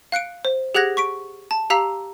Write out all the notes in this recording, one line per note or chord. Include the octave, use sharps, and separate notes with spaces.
F5 F#6 C#7 D7
C5
G4 G#4 F#5 F#6 G#6 A#6
C#6 B6 D7
A5
G4 F5 A#5 E6 B6 F7